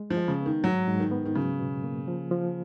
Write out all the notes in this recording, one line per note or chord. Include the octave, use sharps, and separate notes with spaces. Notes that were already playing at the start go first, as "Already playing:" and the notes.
Already playing: G#3
F3
G#3
C#3
D#3 B3
G#2 F#3
G#2
D#3
B3
D#3
C#3 F#3
B2
A#3
F3
F3